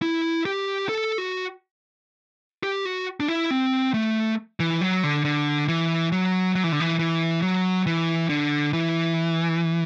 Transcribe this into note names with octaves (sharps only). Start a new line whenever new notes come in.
E4
G4
A4
F#4
G4
F#4
D4
E4
C4
A3
E3
F#3
D3
D3
E3
F#3
F#3
E3
D3
E3
E3
F#3
E3
D3
E3